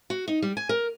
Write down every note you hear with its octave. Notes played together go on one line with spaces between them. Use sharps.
F#4
D#4
G3
G#5
A#4